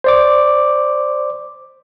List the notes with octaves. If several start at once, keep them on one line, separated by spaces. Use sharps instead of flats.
C5 D5 D6